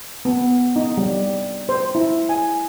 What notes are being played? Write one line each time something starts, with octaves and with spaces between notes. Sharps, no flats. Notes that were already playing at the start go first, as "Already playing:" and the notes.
B3
D#4
G3
C5
E4
G#5